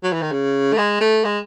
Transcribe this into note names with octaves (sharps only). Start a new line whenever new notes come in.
F#3
E3
D#3
C#3
A3
G#3
A3
G#3